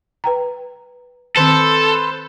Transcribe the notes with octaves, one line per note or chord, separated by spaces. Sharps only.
B4 G5 A#5
D#3 C4 A4 B4 C5